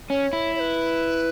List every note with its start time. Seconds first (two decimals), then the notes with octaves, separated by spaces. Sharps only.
0.10 C#4 C#5
0.33 E4
0.55 C#5
0.60 B4